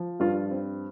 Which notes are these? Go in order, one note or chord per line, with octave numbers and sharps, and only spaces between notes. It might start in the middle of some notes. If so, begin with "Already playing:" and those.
Already playing: F3
G2 F4
C4